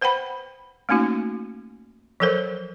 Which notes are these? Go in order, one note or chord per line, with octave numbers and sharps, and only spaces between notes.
B4 C5 F#5 G5 B5
A3 A#3 C#4 D#4 F#4
F3 F#3 A4 A#4 C5